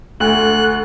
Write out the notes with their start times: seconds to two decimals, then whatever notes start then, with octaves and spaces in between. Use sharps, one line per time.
0.20 D2 F#6